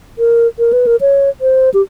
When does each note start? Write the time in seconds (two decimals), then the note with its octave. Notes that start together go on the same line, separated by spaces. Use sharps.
0.19 A#4
0.59 A#4
0.73 B4
0.87 A#4
1.01 C#5
1.41 C5
1.74 G4